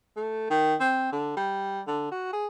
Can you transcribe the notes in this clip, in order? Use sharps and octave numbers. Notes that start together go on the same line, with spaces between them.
A3
D#3
C4
D3
G3
D3
F#4
G#4